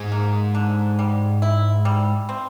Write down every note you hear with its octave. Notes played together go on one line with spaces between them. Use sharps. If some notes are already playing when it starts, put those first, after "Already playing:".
Already playing: G#2 G#3
A#3
D3
G3
E4
G3
C4